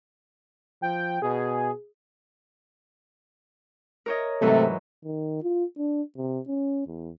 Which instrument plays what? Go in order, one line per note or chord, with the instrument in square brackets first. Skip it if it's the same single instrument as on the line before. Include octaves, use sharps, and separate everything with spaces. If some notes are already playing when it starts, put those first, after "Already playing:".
[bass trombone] F3 [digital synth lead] G5
[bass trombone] B2 [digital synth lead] G#4
[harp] A#4 C#5 D#5
[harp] G#2 E3 F#3 [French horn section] C3 A3
[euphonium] D#3
F4
D4
C3
C#4
E2